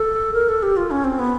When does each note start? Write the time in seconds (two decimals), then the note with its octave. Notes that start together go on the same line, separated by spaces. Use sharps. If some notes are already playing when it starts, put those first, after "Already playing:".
Already playing: A4
0.34 A#4
0.49 A4
0.63 G4
0.77 F4
0.91 C#4
1.04 C4
1.19 B3